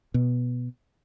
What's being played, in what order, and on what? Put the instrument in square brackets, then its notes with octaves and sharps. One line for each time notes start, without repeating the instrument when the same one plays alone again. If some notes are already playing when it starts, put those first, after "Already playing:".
[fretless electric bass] B2